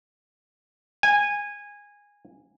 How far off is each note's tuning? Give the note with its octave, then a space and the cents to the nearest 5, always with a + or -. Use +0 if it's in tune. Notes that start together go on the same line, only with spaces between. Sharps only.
G#5 -15